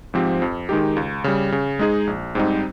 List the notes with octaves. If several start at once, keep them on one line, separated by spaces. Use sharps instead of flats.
G#2 F3 C4 G4
F2
D#3 G#3 D#4 G4
C#2
C#3 G3
C#3
G#3 D#4 G#4
A#1
G#2 G3 C4 D#4